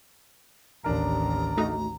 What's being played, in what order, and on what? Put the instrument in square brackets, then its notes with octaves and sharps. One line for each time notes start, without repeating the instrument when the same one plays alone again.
[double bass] A1 D#2 [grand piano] D4 A#4 [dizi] A#5
[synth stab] A3 D#4 F#4